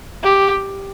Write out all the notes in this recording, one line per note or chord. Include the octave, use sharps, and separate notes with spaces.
G4